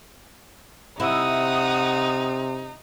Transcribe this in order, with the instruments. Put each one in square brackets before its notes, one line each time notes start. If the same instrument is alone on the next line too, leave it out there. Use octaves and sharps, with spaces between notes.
[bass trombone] C3 [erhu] D#4 [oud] E4 [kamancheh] F#5 D#6